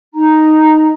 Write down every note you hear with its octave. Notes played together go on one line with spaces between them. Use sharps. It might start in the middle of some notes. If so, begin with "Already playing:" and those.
D#4 A#5